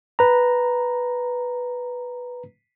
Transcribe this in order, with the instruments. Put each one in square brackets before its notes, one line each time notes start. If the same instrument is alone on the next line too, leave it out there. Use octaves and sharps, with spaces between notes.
[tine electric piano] B4 A#5